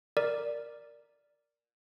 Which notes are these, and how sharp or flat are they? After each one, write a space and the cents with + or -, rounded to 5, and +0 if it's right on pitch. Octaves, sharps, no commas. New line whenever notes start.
A#4 +0 D5 +0